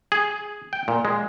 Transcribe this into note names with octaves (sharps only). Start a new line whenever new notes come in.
G#4
G5
A#2
G#3